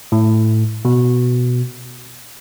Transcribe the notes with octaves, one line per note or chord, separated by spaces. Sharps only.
A2
B2